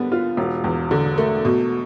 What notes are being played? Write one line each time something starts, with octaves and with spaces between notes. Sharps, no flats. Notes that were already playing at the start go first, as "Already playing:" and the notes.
Already playing: D3 G3 B3
F4
E1
E2
D3
A3
B2